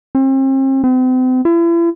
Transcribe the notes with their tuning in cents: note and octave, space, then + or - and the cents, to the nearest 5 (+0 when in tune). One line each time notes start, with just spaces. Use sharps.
C4 +40
C4 -40
E4 +40